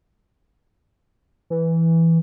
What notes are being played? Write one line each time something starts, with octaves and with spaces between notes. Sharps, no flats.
E3